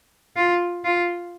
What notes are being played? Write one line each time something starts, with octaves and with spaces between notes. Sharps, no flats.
F4
F4